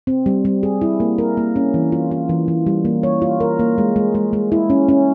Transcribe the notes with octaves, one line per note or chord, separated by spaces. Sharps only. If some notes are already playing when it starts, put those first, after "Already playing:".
C4
G3
G3
G#4
E4
A#3
A#4
A#3
C#4
E3
F4
F4
E3
E3
G3
A#3
C#5
F4
A#4
A#3
G#3
G#3
G#3
G#3
E4
C#4
C#4